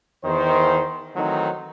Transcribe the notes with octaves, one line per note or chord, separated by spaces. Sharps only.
E2 D#3 C5
D#3 E3 F#3 A3 C4 D#4